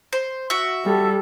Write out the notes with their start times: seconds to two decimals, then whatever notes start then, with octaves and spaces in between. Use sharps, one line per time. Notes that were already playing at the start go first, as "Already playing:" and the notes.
0.13 C5
0.50 F#4 E5
0.85 G3 A4